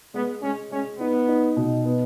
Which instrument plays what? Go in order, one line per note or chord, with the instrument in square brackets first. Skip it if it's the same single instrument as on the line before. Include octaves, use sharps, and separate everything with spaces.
[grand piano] G#3 [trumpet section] B3
[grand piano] G#3 [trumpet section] C#4
[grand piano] G#3 [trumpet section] C#4
[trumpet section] B3 [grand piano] D#4
[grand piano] D#4
B2
B3